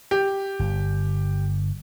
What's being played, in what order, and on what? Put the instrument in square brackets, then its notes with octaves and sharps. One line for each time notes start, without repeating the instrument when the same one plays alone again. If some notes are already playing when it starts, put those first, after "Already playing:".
[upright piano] G4
[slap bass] G1